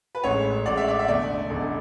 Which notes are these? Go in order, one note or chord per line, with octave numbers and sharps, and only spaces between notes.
B4
A1 A2 G#3 C#5
A1 A2 G#3 D5
E5
D5
E5
E1 E2 D3 A3 D5
E1 E2 D3 A3